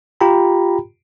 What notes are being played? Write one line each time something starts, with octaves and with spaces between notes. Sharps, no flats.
F4 G4 G5 A#5 B5